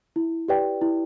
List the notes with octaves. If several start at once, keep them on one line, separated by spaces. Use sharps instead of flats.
E4
G4 B4 D5 G5
E4